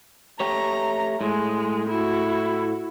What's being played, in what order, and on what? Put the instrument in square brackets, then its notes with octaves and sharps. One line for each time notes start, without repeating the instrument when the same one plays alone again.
[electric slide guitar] A3 G4 C#5 [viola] A#5
[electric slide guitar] A2 [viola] G#3
[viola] E4 F#4